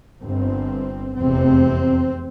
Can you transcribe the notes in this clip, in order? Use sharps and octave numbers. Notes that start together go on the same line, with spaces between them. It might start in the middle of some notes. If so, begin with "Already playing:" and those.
G1 G2 C4
F1 E2 C3 C4